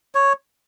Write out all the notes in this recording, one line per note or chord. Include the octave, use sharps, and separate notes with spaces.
C#5